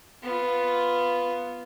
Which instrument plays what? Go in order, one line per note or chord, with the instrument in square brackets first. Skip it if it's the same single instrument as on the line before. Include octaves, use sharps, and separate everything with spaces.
[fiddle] B3 F4